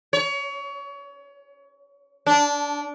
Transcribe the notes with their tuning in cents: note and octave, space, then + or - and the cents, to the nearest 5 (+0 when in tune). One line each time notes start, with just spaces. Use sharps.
C#5 +30
D4 -20